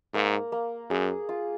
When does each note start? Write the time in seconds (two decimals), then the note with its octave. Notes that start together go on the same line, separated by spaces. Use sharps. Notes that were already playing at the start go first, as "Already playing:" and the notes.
0.14 G#2 A#3
0.52 A#3
0.90 F#2 G#4
1.29 F4